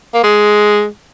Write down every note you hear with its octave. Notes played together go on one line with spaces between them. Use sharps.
A#3
G#3